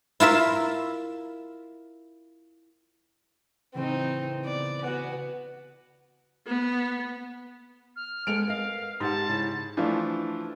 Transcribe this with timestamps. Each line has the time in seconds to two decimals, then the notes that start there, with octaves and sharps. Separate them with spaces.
0.20 E4 F4 A#4 E5
3.74 A1 C#3 E3 C4 D#4
4.45 B3 D5
4.82 B3 F#4 G#5 F#6
6.47 B3
7.96 F6
8.27 G#3 B3 A4 D7 F7
8.48 A#4 D#5 F5
9.00 G#2 G4 F#5 A5
9.29 C#3 E4
9.77 E3 F3 A3 D4 F4